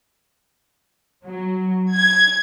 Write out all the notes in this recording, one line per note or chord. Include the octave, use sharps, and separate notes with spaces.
F#3
G#6